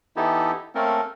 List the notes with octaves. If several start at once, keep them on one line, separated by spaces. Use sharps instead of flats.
E3 B3 D#4 E4 G4 A4
A3 A#3 C4 C#4 A4 A#4